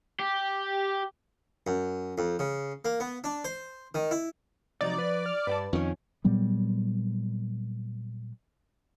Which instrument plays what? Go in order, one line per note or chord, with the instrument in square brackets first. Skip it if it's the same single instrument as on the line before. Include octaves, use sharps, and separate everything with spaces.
[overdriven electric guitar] G4
[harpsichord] F#2
F2
C#3
A#3
B3
D4
C5
D#3
E4
[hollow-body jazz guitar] C3 F3 F#3 [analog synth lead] D#4 [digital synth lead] D5
[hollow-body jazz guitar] F3 [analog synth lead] B4
[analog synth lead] F6
[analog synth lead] G2 [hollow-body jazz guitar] B4 G5 A5
[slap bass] F2 D#3 [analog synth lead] C#4
[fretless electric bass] A#2 F#3 G3 B3